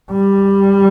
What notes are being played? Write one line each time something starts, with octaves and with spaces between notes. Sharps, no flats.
G3